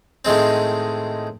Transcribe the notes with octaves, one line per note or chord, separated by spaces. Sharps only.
A2 D#3 G#3 C4